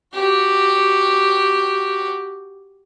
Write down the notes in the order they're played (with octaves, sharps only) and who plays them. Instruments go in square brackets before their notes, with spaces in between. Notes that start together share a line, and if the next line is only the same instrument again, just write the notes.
[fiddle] F#4 G4